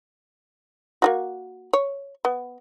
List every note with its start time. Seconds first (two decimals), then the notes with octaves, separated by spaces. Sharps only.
1.02 A#3 F4 F#4
1.73 C#5
2.25 B3